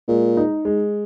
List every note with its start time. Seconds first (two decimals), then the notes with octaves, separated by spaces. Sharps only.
0.08 A#2 G#3
0.37 D#4
0.65 G#3